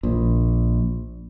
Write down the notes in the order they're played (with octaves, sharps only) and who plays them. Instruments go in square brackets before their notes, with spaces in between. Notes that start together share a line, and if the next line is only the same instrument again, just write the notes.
[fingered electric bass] A#1